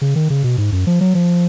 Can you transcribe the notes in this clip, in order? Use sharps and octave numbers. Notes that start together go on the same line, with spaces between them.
C#3
D#3
C#3
B2
G#2
F#2
F3
F#3
F3